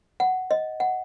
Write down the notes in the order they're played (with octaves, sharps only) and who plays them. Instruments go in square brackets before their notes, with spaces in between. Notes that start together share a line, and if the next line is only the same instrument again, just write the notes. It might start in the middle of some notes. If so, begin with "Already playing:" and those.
[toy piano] F#5
D#5
F#5